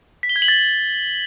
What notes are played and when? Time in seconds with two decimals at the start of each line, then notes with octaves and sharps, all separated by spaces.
0.23 B6
0.29 G7
0.36 G#6
0.42 F#7
0.48 A6